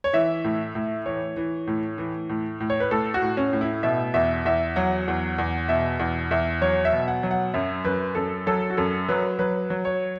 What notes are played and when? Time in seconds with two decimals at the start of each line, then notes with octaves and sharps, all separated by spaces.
0.04 C#5
0.13 E3 E5
0.44 A2
0.75 A2
1.06 E3 C#5
1.37 E3
1.67 A2
1.98 E3
2.29 A2
2.60 A2
2.70 C#5
2.80 B4
2.91 A2 A4
3.14 F#4
3.22 A2
3.37 C#4
3.53 A2
3.61 E4
3.83 B2 E5
4.14 E2 E5
4.45 E2 E5
4.76 F#3 F#5
5.08 E2
5.38 E2
5.68 B2 E5
5.99 E2
6.31 E2 E5
6.61 F#3 C#5
6.85 E5
6.92 B2
7.08 F#5
7.23 F#3
7.31 F#5
7.54 F#2 E5
7.85 F#2 B4
8.15 F#2 A4
8.47 F#3 A4
8.70 F#4
8.77 F#2 A4
9.09 F#3 B4
9.39 F#3 B4
9.70 F#3
9.85 C#5